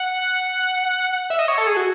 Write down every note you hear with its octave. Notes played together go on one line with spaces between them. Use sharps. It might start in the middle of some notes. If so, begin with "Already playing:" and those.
Already playing: F#5
E5
D#5
C#5
A4
G#4
F#4